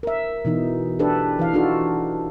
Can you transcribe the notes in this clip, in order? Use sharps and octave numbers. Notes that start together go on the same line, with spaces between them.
A#4 E5
B2 E3 D#4
D4 G4 A4 B4
E3 F5
D4 D#4 F4 F#4 A4